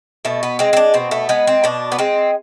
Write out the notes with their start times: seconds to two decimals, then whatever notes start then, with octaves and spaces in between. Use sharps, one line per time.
0.25 B2 A3
0.43 B3
0.59 G#3 C4
0.73 C4
0.77 D4
0.94 B2 C4
1.11 A3
1.29 G#3 B3
1.47 C4
1.64 B2 D4
1.92 B3
1.99 G#3 C4